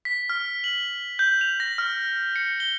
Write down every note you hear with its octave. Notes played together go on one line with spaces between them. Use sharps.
B6
F6
F#7
G6
F7
A#6
F6
C#7
G7